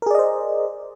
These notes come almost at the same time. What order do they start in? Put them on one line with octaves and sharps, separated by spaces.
A#4 G#4 D5 D#5 C5